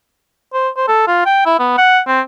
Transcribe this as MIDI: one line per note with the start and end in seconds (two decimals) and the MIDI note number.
0.53 0.69 72
0.77 0.87 72
0.88 1.04 69
1.07 1.23 65
1.26 1.42 79
1.46 1.58 64
1.59 1.73 59
1.78 2.00 78
2.07 2.21 60